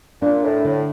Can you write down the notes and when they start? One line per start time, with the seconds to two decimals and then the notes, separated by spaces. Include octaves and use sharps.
0.22 A#2 D4
0.44 A2
0.64 A2 D3